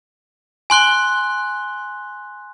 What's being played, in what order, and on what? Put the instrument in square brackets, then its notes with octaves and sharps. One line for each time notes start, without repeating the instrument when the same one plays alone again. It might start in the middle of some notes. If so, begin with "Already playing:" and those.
[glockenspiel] G#5 C6 F#6 G7